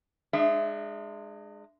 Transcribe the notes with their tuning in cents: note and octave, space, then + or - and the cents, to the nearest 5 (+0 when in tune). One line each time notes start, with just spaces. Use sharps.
G#3 +0 D4 +45 E5 +15